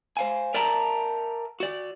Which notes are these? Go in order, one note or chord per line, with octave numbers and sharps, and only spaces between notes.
C5 F5 G#5
A#4 D5 E5 G5 A5 A#5
F#4 D5